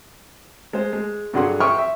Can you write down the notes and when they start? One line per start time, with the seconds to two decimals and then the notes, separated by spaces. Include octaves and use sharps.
0.73 G#3 C5
0.93 G#3
1.33 G2 D3 F#3 G#4 F#5 C6
1.60 E5 G5 C6 C#6 D#6 F6
1.78 E5